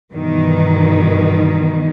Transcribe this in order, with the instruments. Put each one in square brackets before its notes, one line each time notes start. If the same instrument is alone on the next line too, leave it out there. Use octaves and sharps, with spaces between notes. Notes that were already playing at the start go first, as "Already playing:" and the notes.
[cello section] G2 B2 D#3 E3